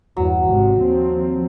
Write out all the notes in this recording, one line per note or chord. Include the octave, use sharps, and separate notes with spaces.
E2 G2 F#3
G#1 G#2 C3
D#2 F3 C4